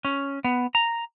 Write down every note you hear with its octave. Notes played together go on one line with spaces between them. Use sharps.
C#4
B3
A#5